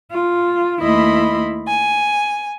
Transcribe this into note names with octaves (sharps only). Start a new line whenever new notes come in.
F4
D#2 A3 E4 D#5 B5 C6
G#5